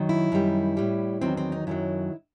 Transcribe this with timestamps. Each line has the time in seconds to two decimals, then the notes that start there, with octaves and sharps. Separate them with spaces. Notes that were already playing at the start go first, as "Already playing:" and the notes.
Already playing: F#2 D#3 F#3
0.09 E4
0.32 F#2 D#3 G3
0.77 A2 G3
1.21 E2 D#3 F#3 C4
1.37 C4
1.52 D#4
1.67 F#2 D#3 F#3 E4